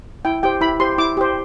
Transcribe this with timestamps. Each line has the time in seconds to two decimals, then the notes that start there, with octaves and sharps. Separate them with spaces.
0.25 E4 G5
0.43 G4 C5 G5
0.61 E4 B5
0.80 G4 C5 C6
0.98 E4 D6
1.17 G4 C5